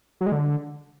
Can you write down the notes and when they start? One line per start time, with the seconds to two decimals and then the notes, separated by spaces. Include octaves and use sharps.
0.21 F#3
0.26 G#3
0.32 D3